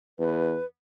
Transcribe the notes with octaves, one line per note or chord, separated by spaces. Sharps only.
E2 B4